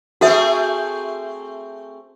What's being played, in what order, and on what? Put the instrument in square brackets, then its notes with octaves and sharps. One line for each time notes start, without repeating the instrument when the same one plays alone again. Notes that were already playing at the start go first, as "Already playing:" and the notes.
[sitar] A3 C4 G#4 [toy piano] F#4 A4 E5